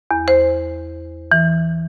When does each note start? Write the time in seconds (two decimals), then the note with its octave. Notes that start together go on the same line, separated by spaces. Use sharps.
0.11 E2
0.28 C5
1.32 E3